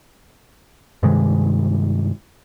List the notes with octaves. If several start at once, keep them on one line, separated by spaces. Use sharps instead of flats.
G2 C3 D#3 G#3